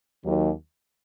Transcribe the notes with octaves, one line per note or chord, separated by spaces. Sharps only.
D#2 D#3 F#3